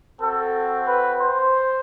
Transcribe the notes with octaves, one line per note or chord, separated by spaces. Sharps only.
C4 F#4 A4
B4
C5